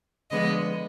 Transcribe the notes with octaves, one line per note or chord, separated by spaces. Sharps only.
D3 F3 G#3 B3 D#5